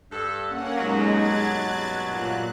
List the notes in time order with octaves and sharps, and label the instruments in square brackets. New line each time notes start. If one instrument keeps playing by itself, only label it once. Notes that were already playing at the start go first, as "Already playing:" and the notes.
[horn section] G2 A4
[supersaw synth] A#3 C#4 F#5
[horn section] G2 B2 F#3 [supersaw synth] G#3 D#4
[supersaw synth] F#6 G#6 A6
A#2 F#6